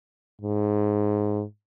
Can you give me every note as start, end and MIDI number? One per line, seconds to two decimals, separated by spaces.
0.41 1.43 44